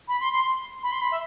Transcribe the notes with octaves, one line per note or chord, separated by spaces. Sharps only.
B5
C6
C6
B5
C6
B5
E5